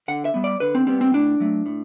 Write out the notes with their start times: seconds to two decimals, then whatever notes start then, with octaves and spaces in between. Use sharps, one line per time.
0.08 D3 F#5
0.25 E5
0.34 G3 B3
0.44 D5
0.60 D3 B4
0.75 C4
0.87 G3 B3 C4
1.01 C4
1.13 A2 D4
1.40 F#3 A3
1.66 A2